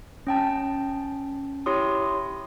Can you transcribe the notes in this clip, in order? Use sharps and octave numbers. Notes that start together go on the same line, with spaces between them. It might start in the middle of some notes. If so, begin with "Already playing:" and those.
C#4 G5 A5
E4 G4 C#5 C6 D#6